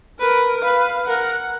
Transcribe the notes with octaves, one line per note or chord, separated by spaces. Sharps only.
A#4 B4
B4 F5
A#4 F#5